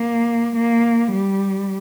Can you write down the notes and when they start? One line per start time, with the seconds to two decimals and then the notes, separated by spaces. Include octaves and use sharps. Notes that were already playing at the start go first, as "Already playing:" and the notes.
Already playing: A#3
0.56 A#3
1.11 G3